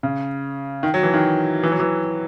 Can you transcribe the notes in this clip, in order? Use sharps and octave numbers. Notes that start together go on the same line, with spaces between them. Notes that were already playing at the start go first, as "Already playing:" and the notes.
C#3
D#3
F#3
E3
D#3
E3
F#3
E3